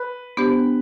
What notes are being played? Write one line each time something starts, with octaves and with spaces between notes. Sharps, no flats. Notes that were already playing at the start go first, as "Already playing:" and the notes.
Already playing: B4
B3 D4 G4 C5